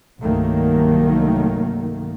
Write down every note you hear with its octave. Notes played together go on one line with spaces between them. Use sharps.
C2 G2 D#3 F#3 A3 A#3